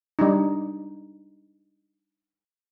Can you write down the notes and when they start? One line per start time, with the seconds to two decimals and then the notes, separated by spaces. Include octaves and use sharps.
0.19 G3 D4 D#4